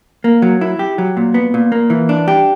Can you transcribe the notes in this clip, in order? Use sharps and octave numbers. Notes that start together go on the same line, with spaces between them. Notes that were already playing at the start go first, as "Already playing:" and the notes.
A#3
F#3
E4
G4
F#3
A#2
B3
A#2
A#3
E3
D4
G4